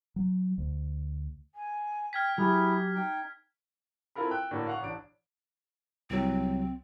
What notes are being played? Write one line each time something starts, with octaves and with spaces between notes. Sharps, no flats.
F#3
D2
G#5
G5 F6 G#6 B6
F#3 E4 G4 G#4
D#4 G5
C4 E4 F4 A4 A#4 B5
G5 E6 F#6
A2 D3 A#3 D4 F#4
F5 F#5 C#6
A1 D4 D7
C2 F#3 C4